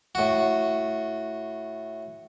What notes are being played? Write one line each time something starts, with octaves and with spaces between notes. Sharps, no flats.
A2 F#4